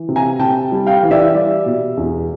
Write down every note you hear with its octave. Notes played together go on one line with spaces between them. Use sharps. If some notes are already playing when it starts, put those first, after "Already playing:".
Already playing: E3
C3
G#5 A#5
C3 G5 A5
G3
F5 G5
E3
D5 E5
G3 D5 E5
B2
E2